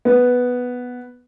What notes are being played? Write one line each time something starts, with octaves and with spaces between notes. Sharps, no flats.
B3